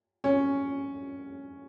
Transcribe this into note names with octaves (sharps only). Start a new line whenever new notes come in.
C#4